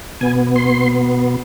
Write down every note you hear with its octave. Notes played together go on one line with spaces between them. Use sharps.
B2 B3 G#5
C6